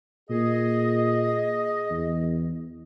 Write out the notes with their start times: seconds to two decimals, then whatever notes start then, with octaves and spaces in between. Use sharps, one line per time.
0.30 A#2 G#4 D#5
1.90 E2